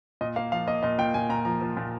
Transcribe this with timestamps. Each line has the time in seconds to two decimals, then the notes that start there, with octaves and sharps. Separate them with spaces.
0.21 A#2 D#5
0.36 A#3 F5
0.52 F3 F5
0.67 A#3 D#5
0.83 A#2 D#5
0.99 A#2 G5
1.14 A#2 G#5
1.29 A#2 A#5
1.45 F3 A#5
1.61 F3
1.77 A#2